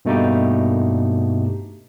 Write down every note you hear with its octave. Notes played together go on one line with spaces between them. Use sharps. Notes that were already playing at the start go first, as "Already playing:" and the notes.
G2 B2 A3 A#3 D#4 G4